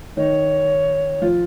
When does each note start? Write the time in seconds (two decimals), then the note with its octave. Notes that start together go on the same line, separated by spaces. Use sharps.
0.17 D#3 D#4 C#5
1.22 F3 F4